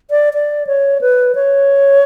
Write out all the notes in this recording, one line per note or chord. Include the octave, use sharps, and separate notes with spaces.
D5
D5
C#5
B4
C#5